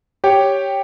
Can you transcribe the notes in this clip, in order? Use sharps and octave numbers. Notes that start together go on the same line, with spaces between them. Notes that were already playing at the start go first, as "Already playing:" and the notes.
G4 C#5 G5